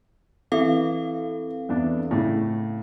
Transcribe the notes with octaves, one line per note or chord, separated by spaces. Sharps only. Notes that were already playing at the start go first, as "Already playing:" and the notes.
E3 C4 A4 E5 F5
E2 D4
A2 C#3